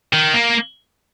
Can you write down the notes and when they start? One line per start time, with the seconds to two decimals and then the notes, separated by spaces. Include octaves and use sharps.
0.13 D#3
0.34 A#3